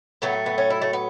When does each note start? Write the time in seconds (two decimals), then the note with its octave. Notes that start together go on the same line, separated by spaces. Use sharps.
0.22 A2 F#3 A3 B3
0.46 B3
0.58 C#4
0.70 E4
0.82 A3
0.93 B3